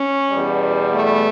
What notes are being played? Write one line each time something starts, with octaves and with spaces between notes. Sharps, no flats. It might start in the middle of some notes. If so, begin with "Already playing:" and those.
Already playing: C#4
E2 B2 G3
A3